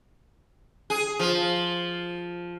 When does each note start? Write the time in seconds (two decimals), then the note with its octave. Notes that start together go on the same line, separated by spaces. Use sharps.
0.90 G#4
1.19 F3